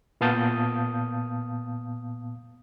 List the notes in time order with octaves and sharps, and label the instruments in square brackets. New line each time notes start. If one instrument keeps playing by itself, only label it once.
[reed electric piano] A#2 B3 F5 A5 D#6 G6